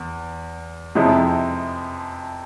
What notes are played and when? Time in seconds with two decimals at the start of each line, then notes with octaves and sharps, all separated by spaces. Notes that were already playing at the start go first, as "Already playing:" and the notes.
Already playing: E2
0.95 F2 C3 F3 G#3 E4